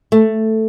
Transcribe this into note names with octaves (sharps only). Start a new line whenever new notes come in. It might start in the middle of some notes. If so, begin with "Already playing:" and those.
A3